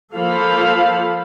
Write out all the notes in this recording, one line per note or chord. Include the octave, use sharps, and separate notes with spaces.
F3 A#3 A4 C5 F5 B5